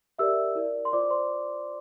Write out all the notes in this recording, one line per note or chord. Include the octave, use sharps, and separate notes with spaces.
G4 A#4 D5 E5 E6
E4 A#4 D5
C6
F4 C5 D5 D6
C5 C6